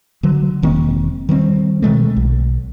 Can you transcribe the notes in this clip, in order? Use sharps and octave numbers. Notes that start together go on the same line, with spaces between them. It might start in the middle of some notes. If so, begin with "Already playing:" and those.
D3 F#3
E1 D#3 A#3 C4
D#3 G3 A3 C4
B2 D#3 G#3 A3
B1